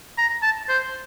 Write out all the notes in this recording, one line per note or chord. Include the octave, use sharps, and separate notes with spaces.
A#5
A5
C5